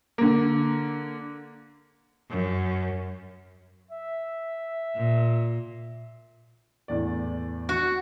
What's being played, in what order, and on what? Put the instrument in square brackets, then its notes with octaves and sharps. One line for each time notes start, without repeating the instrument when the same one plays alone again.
[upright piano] D3 A#3
[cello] F#2
[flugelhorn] E5
[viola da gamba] A#2
[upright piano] E2 A2 D5
[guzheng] F#4